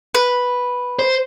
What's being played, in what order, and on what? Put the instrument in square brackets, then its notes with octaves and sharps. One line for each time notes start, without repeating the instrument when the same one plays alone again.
[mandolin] B4
[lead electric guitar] C5